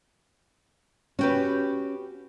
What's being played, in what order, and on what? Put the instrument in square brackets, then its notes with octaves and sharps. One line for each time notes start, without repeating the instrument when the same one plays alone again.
[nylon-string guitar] C#4 [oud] F#4 G4 B4